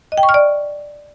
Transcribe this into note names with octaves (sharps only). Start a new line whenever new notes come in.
D#5
G5
C#6
F6
D5